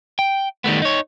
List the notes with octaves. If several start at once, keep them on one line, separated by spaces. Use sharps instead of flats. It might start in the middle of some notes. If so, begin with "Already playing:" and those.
G5
D#3 G3 A3 B3
D#4 C#5